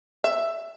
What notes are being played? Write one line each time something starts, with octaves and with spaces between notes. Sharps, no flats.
E5